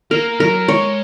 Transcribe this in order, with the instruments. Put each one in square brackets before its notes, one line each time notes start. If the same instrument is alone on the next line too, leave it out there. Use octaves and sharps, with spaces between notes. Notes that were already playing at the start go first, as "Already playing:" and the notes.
[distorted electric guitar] A#3 [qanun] A#4
[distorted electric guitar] F#3 [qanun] A#4
[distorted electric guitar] G#3 [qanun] C#5